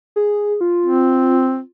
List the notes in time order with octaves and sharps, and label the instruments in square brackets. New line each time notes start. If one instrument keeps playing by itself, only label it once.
[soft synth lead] G#4
F4
[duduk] C4